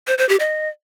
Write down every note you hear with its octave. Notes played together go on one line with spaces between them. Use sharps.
C5
C5
G4
D#5